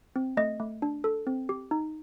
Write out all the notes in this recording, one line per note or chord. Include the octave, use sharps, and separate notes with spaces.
C4
A3 D#5
A3
D4
A4
C4
G4
D#4